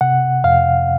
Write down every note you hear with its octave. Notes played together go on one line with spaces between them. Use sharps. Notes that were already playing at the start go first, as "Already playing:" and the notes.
C3 F#5
F2 F5